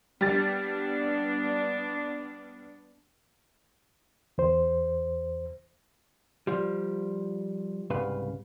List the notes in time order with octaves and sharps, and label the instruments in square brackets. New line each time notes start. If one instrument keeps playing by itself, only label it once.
[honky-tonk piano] G3 A6 [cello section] B3 D4
[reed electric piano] E2 C5
[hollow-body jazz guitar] F3 G3
C2 G#2 C#3 B4 F5